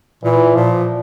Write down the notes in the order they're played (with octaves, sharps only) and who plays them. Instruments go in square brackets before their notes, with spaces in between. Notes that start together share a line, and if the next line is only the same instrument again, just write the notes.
[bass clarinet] A#2 [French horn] E3
[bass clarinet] A#2 [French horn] F3